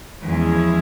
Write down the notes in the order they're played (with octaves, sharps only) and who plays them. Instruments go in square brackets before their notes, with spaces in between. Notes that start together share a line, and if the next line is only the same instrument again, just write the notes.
[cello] E2 [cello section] F3 G#3 C#4 E4 G#4